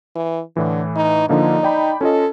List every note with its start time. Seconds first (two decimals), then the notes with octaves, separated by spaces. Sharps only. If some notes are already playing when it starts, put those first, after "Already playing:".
0.16 E3
0.57 A2 D3 E3
0.96 D#4
1.29 D3 F3 A#3 D#4
1.63 D5 G5 B5
2.01 C#4 F4 A4 D#5